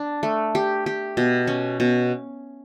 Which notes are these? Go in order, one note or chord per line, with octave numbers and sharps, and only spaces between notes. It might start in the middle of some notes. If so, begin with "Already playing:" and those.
Already playing: D4
A3
G4
G4
B2
C#4
B2